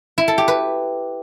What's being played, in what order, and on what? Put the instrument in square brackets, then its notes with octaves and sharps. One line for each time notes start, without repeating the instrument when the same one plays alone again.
[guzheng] E4
A4
G4
B4